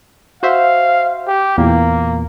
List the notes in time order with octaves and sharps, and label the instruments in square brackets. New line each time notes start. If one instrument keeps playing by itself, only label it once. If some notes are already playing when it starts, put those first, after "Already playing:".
[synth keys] F#4 C5 E5 [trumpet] F5
[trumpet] G4
[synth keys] E2 A#2 [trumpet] A#3